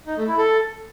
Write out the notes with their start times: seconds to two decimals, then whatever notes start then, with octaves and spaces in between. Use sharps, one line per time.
0.07 D#4
0.17 A3
0.27 E4
0.38 A4